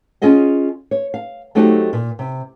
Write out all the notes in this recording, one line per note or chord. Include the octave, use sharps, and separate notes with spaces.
C#4 F4 G#4 D#5 F#5
C#5
F5
F#3 A3 C4 D#4 F#4 G4
A#2
C3